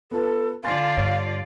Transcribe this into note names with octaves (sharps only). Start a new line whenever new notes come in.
B3 F4 A4 B4
D3 F4 D5 F5 G#5 C6 A6
G2 C#5